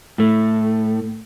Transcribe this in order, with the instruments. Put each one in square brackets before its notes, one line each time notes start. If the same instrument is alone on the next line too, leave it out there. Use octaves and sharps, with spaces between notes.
[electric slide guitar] A2 A3